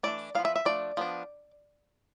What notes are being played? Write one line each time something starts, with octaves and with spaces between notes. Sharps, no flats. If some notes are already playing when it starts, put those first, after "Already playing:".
E3 A3 D4 D5
F3 B3 D4 F5
E5
E5
F3 A3 D4 D5
F3 B3 D4